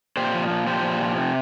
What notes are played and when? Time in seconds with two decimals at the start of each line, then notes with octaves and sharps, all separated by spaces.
0.17 A#2 G4 C5
0.34 F3
0.50 A#2
0.67 F3 G4 C5
0.84 A#2
1.01 F3
1.18 C3